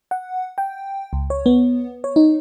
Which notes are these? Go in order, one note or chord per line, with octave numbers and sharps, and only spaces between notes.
F#5
G5
C#2
C#5
B3
C#5
D#4